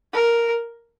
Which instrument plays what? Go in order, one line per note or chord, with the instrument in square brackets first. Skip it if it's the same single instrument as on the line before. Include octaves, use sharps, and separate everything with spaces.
[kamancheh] A#4